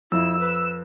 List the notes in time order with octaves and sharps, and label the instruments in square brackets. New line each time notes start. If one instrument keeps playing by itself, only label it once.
[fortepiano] F2 [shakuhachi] E4 [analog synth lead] E6
[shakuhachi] B4